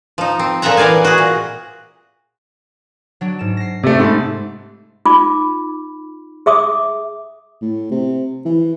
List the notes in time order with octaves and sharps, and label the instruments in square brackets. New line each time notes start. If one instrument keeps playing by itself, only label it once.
[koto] F3 D#4
C4
A#2 F3 A4 E5 F#5 A#5
E3 A#4 D5 F5 G#5
F#4 G#4
A#2
[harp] F#3 D4 D7
G#2 E7
A#6 C7
[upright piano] C3 A3
[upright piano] G#2 [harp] A5 B5
[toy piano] D#4 F4 B5 D6
G#4 E5 D6 D#6
[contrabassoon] A2
C3
E3